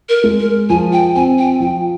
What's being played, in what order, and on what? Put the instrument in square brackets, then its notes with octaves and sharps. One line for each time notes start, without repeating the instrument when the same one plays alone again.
[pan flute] A#4
[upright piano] G#3
[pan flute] A#4
[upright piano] F3 [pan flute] G#5
[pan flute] G5
[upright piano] C4 [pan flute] G#5
[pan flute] G5
[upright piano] F3 [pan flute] G5